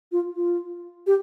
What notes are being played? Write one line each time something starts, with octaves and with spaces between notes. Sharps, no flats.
F4
F4
G4